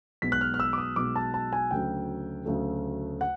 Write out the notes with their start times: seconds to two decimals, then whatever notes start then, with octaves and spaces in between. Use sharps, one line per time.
0.22 B1 B2 G#3 B3 B6
0.32 F#6
0.41 F6
0.54 F6
0.60 E6
0.73 D6
0.78 D#6
0.96 B1 B2 G#3 B3 D6
1.16 A5
1.34 A5
1.53 G#5
1.71 D2 C#3 F#3 A3 G5
2.46 D2 C#3 F#3 A3
3.21 F#5